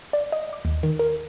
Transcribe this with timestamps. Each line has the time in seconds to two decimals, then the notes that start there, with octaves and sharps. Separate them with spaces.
0.13 D5
0.32 D#5
0.53 D6
0.65 D#2
0.83 D#3
0.99 A#4